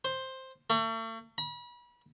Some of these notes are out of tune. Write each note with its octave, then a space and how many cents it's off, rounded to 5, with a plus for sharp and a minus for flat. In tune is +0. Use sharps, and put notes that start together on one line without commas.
C5 +5
A3 +40
B5 -35